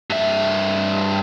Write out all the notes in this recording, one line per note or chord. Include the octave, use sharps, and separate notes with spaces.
G2 E5